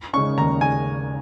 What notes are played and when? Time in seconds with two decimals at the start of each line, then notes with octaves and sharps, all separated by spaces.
0.13 C#3 G#3 C#4 C#6
0.38 D#2 A#5
0.61 C#3 G#5